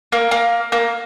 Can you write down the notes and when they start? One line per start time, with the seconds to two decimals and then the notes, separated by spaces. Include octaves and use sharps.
0.12 A#3
0.31 A#3
0.72 A#3